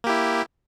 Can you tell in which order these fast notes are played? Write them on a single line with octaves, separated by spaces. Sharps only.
A#3 G4 E4